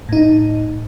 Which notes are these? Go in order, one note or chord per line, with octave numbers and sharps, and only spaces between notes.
A2 D#4